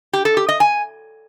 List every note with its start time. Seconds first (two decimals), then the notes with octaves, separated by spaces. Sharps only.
0.13 G4
0.25 A4
0.37 G4
0.48 D#5
0.60 G#5